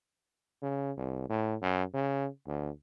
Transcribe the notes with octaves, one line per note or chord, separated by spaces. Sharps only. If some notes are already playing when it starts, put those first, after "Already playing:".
C#3
C2
A2
F#2
C#3
D2